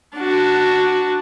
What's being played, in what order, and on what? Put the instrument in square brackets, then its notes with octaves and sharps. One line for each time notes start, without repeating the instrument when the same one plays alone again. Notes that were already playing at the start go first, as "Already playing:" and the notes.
[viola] D4 F#4